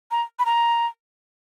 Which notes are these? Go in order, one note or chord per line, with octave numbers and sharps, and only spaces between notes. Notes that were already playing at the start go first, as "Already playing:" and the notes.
A#5
B5
A#5